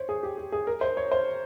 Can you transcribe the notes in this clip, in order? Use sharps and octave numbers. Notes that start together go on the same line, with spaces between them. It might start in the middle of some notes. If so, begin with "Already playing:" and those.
Already playing: C5 C#5
G#4
G4
G4
G#4
A#4
C5
C#5
C5